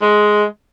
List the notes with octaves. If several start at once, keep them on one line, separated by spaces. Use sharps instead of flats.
G#3